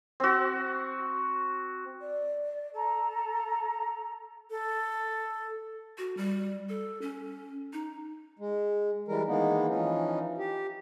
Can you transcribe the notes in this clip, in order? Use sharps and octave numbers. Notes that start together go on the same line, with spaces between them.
C4 F#4
D5
A4 A#5
A4
F#4
G3
A4
C#4
D#4
G#3
E3 G3 G#3 A#4
D#3 E3 G#3 A#3 B3 D#4
E3 F3 C#4 D#4
G4